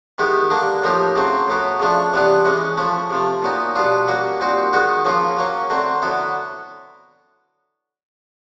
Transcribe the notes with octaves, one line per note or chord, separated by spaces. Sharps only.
D#3 G#3 B3 E4 G4
D3 G3 A#3 D4
A2 F3 A#3 D#4 G4
C#3 F#3 A3 C4
A2 F#3 B3 E4
C#3 F3 A3 D4
C3 E3 G3 B3 D4
E3 G#3 C#4
F3 A3 C#4 E4
C3 F3 A3
A#2 F#3 B3 D#4
B2 G3 B3 D4 F4
G3 A#3 C#4 F#4
A#2 G3 C4 D#4 F#4
D#3 G#3 B3 D#4 F#4
C#3 F3 A#3 C#4 F4
F#3 A#3 C#4
D3 F#3 A3 C4
D3 F#3 B3 E4